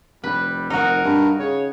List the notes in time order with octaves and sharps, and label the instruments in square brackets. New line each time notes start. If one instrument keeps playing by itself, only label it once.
[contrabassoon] F1 [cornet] G3 [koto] B4
[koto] D#4 F#4 [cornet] A#4
[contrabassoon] G2
[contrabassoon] C#3 [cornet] C#5